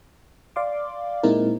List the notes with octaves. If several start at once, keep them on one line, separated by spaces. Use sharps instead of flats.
D5 F5 C6 D6
A#2 G#3 C4 D#4 E4 A#4